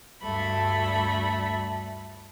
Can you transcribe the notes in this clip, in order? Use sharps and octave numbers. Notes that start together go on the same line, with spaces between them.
D2 G2 A3 B5